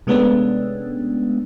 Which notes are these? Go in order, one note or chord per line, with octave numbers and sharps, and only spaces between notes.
C3 G#3 A3 B3 C#4 D4